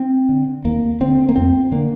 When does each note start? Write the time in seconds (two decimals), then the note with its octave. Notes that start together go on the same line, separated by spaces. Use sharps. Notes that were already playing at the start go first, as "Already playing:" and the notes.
Already playing: C4
0.29 D3
0.64 D#2 A#3
1.00 D3 C4
1.29 A#3
1.36 F2 C4
1.72 D3 A#3